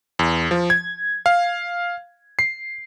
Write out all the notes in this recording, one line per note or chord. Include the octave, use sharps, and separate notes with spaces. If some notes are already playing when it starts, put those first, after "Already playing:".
E2
F3
G#6
F5
C7